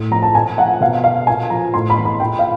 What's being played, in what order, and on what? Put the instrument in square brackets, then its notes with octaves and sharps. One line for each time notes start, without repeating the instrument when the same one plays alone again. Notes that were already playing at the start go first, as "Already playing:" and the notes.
Already playing: [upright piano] A2
F3 A#5
A5
A#2 G#5
F3 F#5
B2 F5
F5
A#2 G#5
F3 A#5
A2 C6
B5
E3
B5
A#2 G5
F5